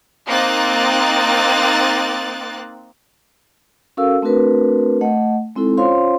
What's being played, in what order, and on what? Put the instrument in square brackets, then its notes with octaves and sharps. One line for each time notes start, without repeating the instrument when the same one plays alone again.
[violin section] A#3 C4 D#4 F#6 A6
[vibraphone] C#4 F#4 A4 A#4 F5 E6
A3 C4 D4 F#4 A#4 B4
A3 D#5 F#5
G#3 C4 D#4 E4 A4
C#4 F4 C5 C#5 F5 C6